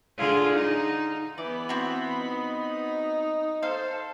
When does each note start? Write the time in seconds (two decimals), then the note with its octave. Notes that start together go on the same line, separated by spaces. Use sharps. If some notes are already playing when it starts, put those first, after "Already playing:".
0.17 D3 F4 G#4
0.53 D#4
1.38 E3 B3 D5 B5
1.69 C4 F#4
2.20 D#4
3.63 A4 C5 F5